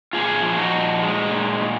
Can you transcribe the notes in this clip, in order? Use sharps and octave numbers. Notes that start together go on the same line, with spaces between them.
A#2 F4 G#4
F3
D#4 F#4
A#2
G#3
A#2
A#2